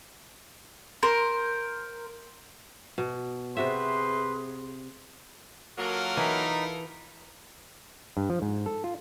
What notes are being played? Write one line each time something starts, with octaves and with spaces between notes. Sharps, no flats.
A#4 C5
B2
C3 F#4 G#4 B4 C5 E5 C6
F#3 A#3 F4 A4 A#4
E3 D#4 B5
G2
F3
G#2
A4
F4